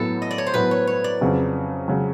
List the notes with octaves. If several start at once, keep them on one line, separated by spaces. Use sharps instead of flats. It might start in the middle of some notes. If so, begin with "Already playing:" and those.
Already playing: A2 F#3 B3 A4
D#5
D5
C#5
C5
A2 F#3 B3 B4
C#5
C#5
D5
F2 C#3 F#3
C#3 F#3